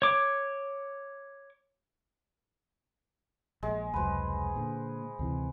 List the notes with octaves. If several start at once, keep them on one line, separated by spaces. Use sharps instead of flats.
C#5 D6
A#1 G#3
F1 C#2 F#3 B4 C5
A#2 D3
D2 C3 E3